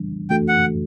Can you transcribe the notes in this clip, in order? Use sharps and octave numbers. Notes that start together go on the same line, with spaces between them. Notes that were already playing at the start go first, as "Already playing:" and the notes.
Already playing: E3 G3 D4
E3 A3 D4 F#4 A4 G5
F#5